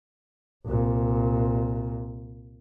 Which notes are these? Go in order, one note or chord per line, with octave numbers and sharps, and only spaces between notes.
C2 A#2